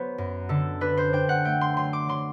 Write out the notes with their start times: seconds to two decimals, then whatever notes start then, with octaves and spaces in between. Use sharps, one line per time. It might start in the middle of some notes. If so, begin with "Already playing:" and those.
Already playing: F#3 B3 C5
0.18 F#2
0.49 D3 A4
0.81 D4 B4
0.97 C5
1.13 D4 G5
1.29 F#5
1.45 A3 G5
1.61 C6
1.77 F#3 C6
1.93 D6
2.09 F#3 C6